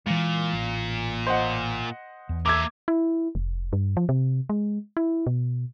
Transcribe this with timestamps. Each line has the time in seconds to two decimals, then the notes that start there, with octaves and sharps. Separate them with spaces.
0.07 A#2 E3 G#3
0.53 A1
1.27 C5 D#5 F#5
2.29 E2
2.46 A#3 E5 D6 E6 G#6
2.88 E4
3.35 F1
3.73 G2
3.97 F3
4.09 C3
4.49 G#3
4.97 E4
5.27 B2